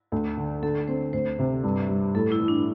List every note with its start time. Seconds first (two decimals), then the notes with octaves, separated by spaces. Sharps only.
0.12 D2
0.37 D3
0.63 D3 A4
0.88 C4 C5
1.13 D2 C5
1.39 C3
1.63 G2
1.89 G3
2.15 A2 A4
2.32 E4
2.40 E3
2.48 D4